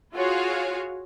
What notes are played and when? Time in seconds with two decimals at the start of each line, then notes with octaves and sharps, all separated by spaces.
0.14 F4 F#4 G#4 C#5 F5